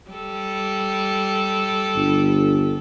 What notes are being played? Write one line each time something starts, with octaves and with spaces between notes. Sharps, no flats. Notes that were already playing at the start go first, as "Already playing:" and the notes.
G3 A4
G1